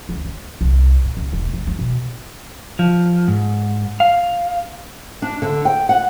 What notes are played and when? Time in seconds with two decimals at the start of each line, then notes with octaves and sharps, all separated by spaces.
0.09 C#2
0.25 D#3
0.61 C2
1.04 A#2
1.17 C#2
1.33 E1
1.53 F1
1.67 G#3
1.79 B2
2.79 F3
3.28 G#2
4.00 F5
5.22 D4
5.42 D3
5.65 G5
5.89 F#5